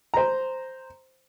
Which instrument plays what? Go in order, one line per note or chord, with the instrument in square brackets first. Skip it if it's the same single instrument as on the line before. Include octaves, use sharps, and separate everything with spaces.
[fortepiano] C5 A#5